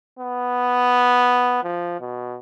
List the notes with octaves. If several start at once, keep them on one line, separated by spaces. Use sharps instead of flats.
B3
F3
B2